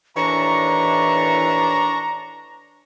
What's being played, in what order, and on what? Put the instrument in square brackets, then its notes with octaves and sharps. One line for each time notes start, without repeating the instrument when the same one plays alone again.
[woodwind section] D#2 A2 E3 [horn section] D4 A#5 [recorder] C#6